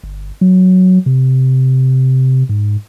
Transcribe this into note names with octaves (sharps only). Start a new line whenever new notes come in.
G1
F#3
C3
G#2